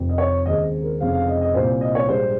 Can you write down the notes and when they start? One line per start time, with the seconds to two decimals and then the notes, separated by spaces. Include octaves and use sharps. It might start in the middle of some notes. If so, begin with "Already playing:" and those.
Already playing: F1 F2 C3
0.09 D#5
0.18 C#5
0.46 D#2 C#3 G#3 C4 D#5
0.82 A#4
0.99 F1 F2 C#3 G#3 C4 F5
1.14 F5
1.27 D#5
1.41 D#5
1.54 C2 A#2 G3 C4 C5
1.81 D#5
1.95 C#5
2.09 A#1 G#2 G3 C5